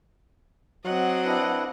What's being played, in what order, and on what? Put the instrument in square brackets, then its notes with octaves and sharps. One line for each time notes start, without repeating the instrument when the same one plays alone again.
[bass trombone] F#3 [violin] C4 D#5 [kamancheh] F#5
[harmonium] D4 E4 B4